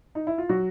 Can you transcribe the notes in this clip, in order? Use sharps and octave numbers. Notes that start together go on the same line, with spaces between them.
D#4
E4
F4
F#3 F#4